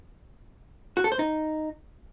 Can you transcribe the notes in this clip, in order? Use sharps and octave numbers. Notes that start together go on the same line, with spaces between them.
F#4
A4
C5
D#4